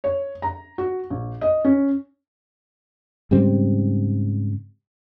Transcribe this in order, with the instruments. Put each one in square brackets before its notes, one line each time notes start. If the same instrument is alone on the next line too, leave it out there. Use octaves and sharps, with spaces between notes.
[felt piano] C#5
A#5
F#4
A#1
D#5
C#4
[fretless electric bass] G#2 C#3 G3 C4